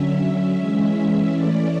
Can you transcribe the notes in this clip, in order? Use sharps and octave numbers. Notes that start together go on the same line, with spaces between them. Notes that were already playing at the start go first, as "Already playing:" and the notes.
Already playing: D3 F#3 C#4 E5
E3 G#3 C#4
E3 A3 C#4 D5